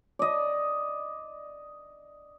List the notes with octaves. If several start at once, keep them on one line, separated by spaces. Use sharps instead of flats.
D5 D#5